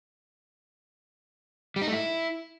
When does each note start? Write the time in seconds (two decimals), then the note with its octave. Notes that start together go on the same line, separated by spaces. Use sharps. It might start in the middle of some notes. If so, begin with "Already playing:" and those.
1.76 G3
1.82 D#4
1.87 A3
1.93 E4